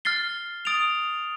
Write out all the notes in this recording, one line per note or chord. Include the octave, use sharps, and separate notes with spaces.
F6 A6 C7 G7
D#6 A6 D7 F7